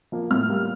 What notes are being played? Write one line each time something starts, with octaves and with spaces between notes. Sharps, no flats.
F3 A#3
A2 F6
G3 A#3